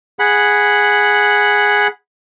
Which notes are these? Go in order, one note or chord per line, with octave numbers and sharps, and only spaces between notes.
G#4 F#5 B5